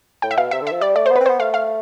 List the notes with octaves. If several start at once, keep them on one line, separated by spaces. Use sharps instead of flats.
A2 G5
E5
B2 F5
C3 E5
D3
E5
F3
G3 D5
A3 D5
B3 C5
C4 B4
B3 C5
A3 F5
F5